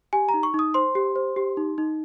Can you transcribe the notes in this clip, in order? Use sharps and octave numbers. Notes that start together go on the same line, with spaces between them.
G4 G#5
A#5
D#4
C#6
D#4 D#6
C5 C6
G4
C5
G4
D#4
D#4